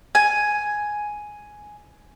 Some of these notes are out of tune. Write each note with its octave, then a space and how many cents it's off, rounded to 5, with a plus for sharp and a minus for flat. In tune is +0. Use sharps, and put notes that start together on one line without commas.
G#5 +5